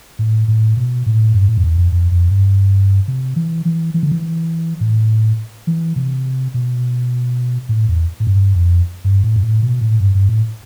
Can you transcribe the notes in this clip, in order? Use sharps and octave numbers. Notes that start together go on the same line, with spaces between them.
A2
A2
B2
A2
G2
A2
F2
E2
F2
F2
F2
G2
C3
E3
E3
E3
D3
E3
A2
E3
C3
B2
A2
E2
A2
G2
F2
G2
A2
G2
A2
B2
A2
G2
G2
A2